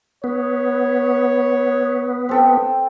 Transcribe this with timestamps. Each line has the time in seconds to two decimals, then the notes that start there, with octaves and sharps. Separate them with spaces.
0.24 B3 C#5
2.29 C4 A4 G5